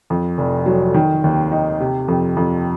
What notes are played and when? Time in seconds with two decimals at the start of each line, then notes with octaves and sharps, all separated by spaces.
0.10 F2
0.38 F1
0.66 F#3
0.94 D#3
1.24 D#2
1.52 D#4
1.80 C3
2.08 F2
2.37 F2